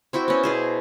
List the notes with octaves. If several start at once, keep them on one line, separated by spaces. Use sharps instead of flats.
C4 E4 F#4 G5
B3 C#4
B2 G#4 C5